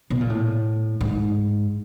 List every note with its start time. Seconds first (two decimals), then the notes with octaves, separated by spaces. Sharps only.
0.10 B2
0.21 A#2
0.30 A2
1.01 G#2